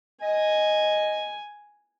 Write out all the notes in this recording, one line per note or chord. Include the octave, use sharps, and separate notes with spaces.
D#5 G#5